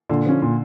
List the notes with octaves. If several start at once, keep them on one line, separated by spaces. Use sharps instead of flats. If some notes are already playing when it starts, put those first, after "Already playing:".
A#2 D3
F3 C#4
A#2